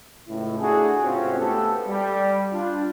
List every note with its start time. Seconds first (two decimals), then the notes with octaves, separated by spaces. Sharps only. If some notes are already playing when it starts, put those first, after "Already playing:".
0.27 C#2 A2 E4
0.60 A3 D4 E4 F#4 G#4
1.03 G#2 C3 C4 C#4 F4 F#4
1.39 A3 B3 G4 A4
1.87 G3
2.51 D4 F4